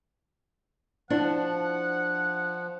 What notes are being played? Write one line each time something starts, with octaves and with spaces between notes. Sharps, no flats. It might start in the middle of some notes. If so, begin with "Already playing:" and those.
F3 D4 E4 C5 F#5